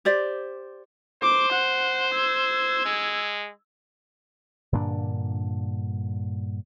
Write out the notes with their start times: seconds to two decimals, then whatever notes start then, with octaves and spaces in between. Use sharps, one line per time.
0.05 G4 C5 D5
1.22 C5 D6
1.52 F#5
2.14 E6 G#6
2.85 G#3
4.72 G2 A#2 D3 D4